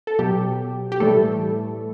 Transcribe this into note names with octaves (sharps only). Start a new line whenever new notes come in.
A4
B2 F#3 G4
G4
A2 E3 G3 A3 A4